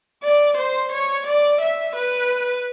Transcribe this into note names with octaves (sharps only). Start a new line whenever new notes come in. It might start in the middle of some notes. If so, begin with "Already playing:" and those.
D5
C5
C#5
D5
E5
B4